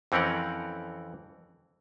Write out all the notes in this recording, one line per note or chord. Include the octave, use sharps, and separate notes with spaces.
F2 E3 C4 C#4 A#4 F#5